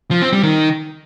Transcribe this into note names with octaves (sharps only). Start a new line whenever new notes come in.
F3
C4
G3
D#3